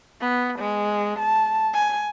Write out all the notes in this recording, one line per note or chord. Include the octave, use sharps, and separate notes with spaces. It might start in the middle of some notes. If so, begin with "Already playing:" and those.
B3
G#3
A5
G#5